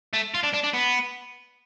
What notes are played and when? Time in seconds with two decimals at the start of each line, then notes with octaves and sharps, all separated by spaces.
0.13 A3
0.34 F4
0.43 D4
0.54 D4
0.64 D4
0.74 B3